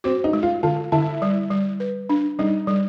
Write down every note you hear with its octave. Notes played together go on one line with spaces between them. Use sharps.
C4 F#4
D#4
G#3
F4
D3 F4
D3 E4
G3
G3
B4
D4
G3 D#4
G3